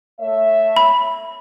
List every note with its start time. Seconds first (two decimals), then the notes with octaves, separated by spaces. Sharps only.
0.20 A3 C#5 E5
0.76 B5